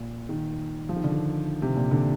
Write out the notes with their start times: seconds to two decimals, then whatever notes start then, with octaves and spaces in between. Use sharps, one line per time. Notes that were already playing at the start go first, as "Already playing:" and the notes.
Already playing: A#2
0.29 D#3
0.89 F3
0.96 D#3
1.04 D3
1.12 D#3
1.62 C3
1.76 A#2
1.91 D3